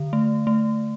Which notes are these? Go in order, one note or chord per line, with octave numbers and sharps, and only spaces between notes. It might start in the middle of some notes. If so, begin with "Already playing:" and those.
Already playing: D3
A3
A3